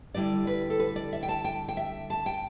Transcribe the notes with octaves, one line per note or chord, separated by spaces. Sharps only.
D3 G3 E4 D5
B4
A4
B4
D5
E5
G5
A5
G5
G5
E5
A5
G5